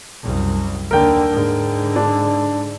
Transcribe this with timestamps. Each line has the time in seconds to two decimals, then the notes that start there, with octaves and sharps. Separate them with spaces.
0.23 C2 F#2
0.91 D#2 D3 A#4 G5
1.31 G#2 D3
1.96 D4